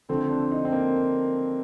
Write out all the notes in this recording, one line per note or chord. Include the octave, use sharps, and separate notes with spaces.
D3 F3 A3 C4
D4
D#4
C4
A#3